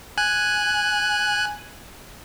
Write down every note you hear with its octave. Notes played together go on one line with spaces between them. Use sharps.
G#5 F#6